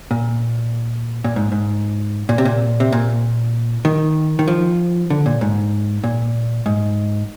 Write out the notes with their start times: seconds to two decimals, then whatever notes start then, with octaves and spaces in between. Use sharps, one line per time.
0.11 A#2
1.24 A#2
1.36 G#2
1.52 G#2
2.29 A#2
2.38 C3
2.45 A#2
2.80 C3
2.92 A#2
3.85 D#3
4.39 D#3
4.48 F3
5.10 D3
5.26 A#2
5.41 G#2
6.04 A#2
6.66 G#2